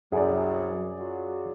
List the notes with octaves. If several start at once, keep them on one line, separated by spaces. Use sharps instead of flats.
C2 F#2 F#3 G#4 D5
F#3 F4 F#4